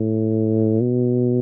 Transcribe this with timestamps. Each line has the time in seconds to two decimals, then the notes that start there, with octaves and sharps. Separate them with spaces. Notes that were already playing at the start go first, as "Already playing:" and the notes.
Already playing: A2
0.82 B2